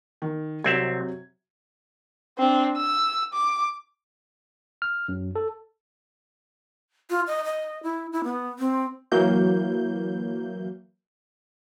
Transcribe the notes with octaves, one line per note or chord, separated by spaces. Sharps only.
D#3
C2 C3 F#3 C4 E5 G#6
C4 D4
E6
D6
F6
F#2
A4
F4
D#5
D#5
E4
E4
B3
C4
E3 F#3 A#3 E4 G6